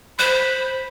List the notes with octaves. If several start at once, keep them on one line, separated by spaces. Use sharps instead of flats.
C5 B5 F#6 B6